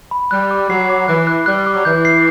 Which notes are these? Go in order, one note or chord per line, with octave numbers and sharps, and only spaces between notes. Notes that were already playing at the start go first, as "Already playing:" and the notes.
B5
G3 F#6
D6
F#3 C7
D6
E3 F#6
F#6
G3 F#6
D6
F#3
E3 G6
C7